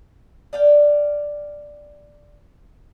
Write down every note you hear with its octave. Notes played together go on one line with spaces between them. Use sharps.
D5 F5 G5